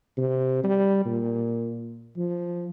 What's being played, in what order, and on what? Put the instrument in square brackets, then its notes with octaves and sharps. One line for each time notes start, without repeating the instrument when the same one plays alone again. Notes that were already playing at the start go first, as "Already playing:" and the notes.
[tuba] C3
G3
A#2
F3